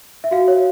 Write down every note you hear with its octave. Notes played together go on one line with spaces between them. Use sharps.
E5
F#4 F5
C#5